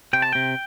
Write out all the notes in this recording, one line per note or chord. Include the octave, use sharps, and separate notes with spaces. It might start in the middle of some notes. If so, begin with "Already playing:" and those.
C3 G5
A5
C3 G5